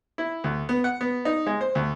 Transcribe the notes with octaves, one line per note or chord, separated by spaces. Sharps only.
E4
D2
B3
F#5
B3
D#4
G#3
C5
D2